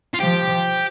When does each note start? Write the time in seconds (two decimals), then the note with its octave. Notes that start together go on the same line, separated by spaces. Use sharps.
0.14 F4
0.20 F3 G4